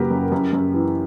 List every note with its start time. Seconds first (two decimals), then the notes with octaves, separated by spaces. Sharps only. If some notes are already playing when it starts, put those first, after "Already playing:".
Already playing: F#2 C#3 F#3 A#3 G4 A#4 B4
0.11 F#2
0.32 F#2
0.53 F#2
0.74 E3